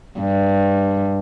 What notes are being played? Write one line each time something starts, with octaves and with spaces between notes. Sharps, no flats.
G2